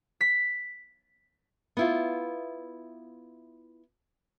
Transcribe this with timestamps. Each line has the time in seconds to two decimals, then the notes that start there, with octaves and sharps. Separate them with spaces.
0.21 B6
1.77 B3 E4 F4